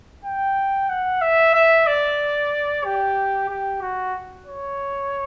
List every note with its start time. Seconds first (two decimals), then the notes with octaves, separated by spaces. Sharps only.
0.24 G5
0.89 F#5
1.21 E5
1.54 E5
1.87 D5
2.85 G4
3.49 G4
3.81 F#4
4.46 C#5